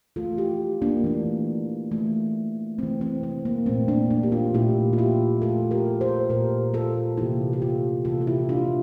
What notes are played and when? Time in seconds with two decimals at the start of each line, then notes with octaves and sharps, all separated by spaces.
0.16 E3 A3 F4 A4
0.37 E4 G4
0.82 A#3 D4
1.04 E3 A3
1.92 E3 A3
2.79 E3 A3 C4
3.01 C4
3.23 C4
3.45 A#3
3.66 A#2 A3 C4
3.88 A#3 D4
4.10 A#3 D4
4.23 G4
4.32 D4 F4
4.54 A#2 A3 E4 G4
4.93 F4
4.98 E4 G4
5.42 A#2 A3 F4 A4
5.71 G4 A#4
6.01 A4 C5
6.29 A#2 A3 G4 A#4
6.74 F4 A4
7.17 C3 E3 A#3 E4 G4
7.53 G4
7.62 F4 A4
8.05 C3 E3 A#3 F4 A4
8.21 F4
8.27 E4 G4
8.49 D4 F4